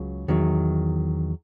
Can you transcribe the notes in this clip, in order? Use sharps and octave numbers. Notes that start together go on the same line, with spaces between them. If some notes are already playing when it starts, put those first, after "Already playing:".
Already playing: C#2 C#3 F#3
E2 D#3 F#3